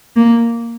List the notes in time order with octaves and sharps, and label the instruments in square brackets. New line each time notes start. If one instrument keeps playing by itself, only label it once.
[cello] A#3